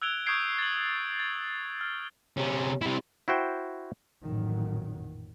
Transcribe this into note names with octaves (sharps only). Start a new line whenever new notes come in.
E6 F#6 G#6 D7 F7 G7
C#6 D#6 G6 G#6 C7 D7
A6 F#7
A6
F6
C3 C#4
C3 E4
E4 F#4 C5 G5
A1 F2 A#2 D#3 F#3